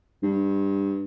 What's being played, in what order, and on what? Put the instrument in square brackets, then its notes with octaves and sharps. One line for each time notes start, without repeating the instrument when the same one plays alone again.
[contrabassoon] G2